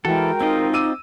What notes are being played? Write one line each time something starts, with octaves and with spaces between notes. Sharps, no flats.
E3 G#3 F#4 A4 A#4 G5
C4 D#4 F4 D#5
D6 E6 D#7